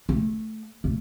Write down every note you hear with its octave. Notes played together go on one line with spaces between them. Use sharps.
A3
A3